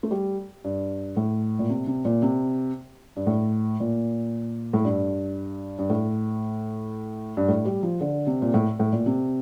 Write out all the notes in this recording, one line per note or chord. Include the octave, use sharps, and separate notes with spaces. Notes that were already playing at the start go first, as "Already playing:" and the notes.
A3
G3
G2
A2
A#2
C3
C3
A#2
C3
G2
A2
A#2
A2
G2
G2
A2
G2
A2
G3
F3
D3
C3
A#2
A2
A2
A#2
C3